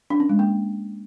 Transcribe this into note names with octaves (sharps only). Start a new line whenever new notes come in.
D4
C#4
G#3
A#3